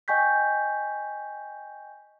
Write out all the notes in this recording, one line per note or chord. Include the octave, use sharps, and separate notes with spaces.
D#5 G5 G#5 C#6 G6 B6